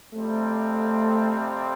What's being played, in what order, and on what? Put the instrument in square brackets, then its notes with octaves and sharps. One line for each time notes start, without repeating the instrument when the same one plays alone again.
[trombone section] F2 C3 G3 C4 [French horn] A3